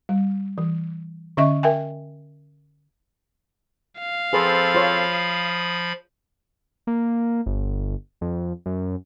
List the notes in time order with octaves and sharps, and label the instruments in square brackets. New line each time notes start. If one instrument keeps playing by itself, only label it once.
[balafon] G3
E3
D3 C#4 D#5 E5 C#6
A#4 E5 G5 G#5
[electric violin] F5
[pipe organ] F3 B5 [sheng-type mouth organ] C4 A4 [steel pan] G#4 B4 C5
[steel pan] F4 C5 C#5
[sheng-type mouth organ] D#6
[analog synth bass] A#3
G1
F2
F#2